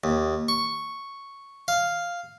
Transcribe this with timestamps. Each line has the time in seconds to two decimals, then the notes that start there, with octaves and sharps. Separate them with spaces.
0.04 D#2
0.48 C#6
1.68 F5